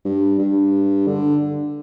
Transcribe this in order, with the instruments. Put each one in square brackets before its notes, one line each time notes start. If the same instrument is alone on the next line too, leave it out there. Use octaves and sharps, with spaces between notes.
[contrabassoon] G2
G2
D3